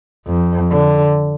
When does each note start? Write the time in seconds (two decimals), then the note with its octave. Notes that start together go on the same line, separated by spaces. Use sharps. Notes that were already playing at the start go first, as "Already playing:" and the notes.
0.27 F2
0.71 D3